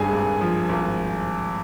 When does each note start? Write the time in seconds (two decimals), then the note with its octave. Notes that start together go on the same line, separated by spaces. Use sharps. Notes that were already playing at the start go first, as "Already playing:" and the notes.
Already playing: G#1 G2 G#4 G#5
0.12 G#1
0.41 F3
0.69 G#1